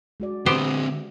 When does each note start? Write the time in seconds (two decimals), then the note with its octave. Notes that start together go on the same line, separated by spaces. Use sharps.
0.20 G#3 F#4 D5
0.46 D3 B3 C4 G4 C5